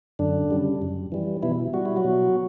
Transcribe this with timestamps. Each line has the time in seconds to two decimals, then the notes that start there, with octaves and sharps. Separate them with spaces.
0.19 F#2 D3 D4
0.51 C#3 G3
0.82 F#2
1.12 E3 G3
1.42 B2 E3 E4
1.74 G3 F#4
1.86 E4
1.96 F#3 F#4
2.04 B2